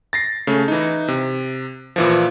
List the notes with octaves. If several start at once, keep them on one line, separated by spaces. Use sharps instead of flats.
A6 A#6 C7
C#3 A3
E3 D#4
C3
A#2 E3 F3